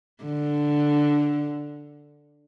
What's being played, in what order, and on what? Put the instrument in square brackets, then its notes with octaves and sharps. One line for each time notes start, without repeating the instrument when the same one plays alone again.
[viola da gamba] D3